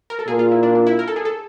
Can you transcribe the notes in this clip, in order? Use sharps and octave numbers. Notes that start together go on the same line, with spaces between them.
A#4
A4
A#2 G#4
F4
E4
D4
D4
E4
A#4
A4
G#4
A4